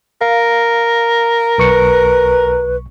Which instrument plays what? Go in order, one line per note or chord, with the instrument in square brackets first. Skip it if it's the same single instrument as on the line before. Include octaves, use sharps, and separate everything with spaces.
[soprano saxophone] A#4 [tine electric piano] F5
[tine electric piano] B1 C#6 C#7 [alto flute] B4